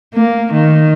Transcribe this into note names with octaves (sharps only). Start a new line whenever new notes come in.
A#3
D#3